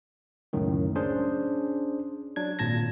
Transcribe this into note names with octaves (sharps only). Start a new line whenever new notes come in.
C#2 F#2 A2 D#3
C#4 D4 G#4 C5
F#3 D4 G#6
G#1 A#2 A5 G#6 A#6